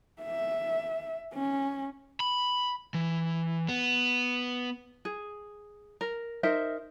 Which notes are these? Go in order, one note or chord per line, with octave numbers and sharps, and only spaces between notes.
E5
C#4
B5
E3
B3
G#4
A#4
D#4 A#4 C5 E5